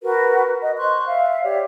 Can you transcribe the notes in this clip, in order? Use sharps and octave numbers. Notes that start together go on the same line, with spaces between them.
F#4 A#4 B4
D#5
C5 C6 C#6 F#6
E5 F5
G4 C#5 D5 E5